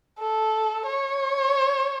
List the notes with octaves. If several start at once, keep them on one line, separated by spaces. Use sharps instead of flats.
A4
C#5